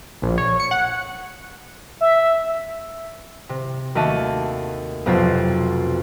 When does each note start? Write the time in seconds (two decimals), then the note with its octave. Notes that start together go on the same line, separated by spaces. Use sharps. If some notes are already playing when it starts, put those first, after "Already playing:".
0.22 A#1
0.38 C#5
0.60 C#7
0.71 F#5
2.01 E5
3.49 C3
3.95 D#2 A3 F#4 E5 A5 D#7
5.06 B1 F2 C3 B3 C4 A6